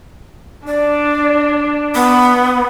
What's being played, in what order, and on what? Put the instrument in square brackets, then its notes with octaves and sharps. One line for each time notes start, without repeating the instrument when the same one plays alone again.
[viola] D4 [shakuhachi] D5
[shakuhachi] B3